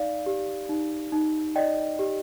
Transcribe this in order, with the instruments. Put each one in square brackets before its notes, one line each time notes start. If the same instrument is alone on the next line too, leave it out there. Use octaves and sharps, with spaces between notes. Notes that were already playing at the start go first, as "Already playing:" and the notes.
Already playing: [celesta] D#4 D5 F5
G4
D#4
D#4
D5 D#5 G5
G4